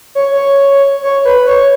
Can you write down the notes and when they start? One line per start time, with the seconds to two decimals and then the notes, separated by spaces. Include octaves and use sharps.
0.15 C#5
0.33 C#5
1.03 C#5
1.25 B4
1.47 C#5